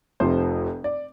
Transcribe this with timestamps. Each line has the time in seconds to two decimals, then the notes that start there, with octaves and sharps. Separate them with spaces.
0.20 F1 F2 C3 F3 C5
0.84 D5